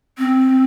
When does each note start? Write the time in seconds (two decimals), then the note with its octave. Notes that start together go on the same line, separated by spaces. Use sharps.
0.18 C4